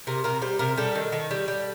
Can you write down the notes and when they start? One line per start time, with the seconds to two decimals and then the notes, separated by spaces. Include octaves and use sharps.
0.07 C3 A#4
0.24 C3 A#4
0.42 G3 C5
0.59 C3 A#4
0.77 G3 A4
0.95 D#3
1.12 D#3 A4
1.31 G3
1.48 G3